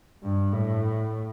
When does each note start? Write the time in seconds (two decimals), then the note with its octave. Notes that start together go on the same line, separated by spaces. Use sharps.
0.23 G2
0.53 A2